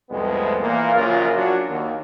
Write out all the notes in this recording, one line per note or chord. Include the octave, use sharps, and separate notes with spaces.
C2 F2 G#3 A3 B3
A#2 E3 A#3
A#1 F#2 C#3 F4 A#4
F#3 D4 F#4
D#2